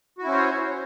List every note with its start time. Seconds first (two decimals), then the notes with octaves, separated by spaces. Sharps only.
0.19 F#4
0.23 E4
0.27 C#4
0.31 C5
0.35 C#5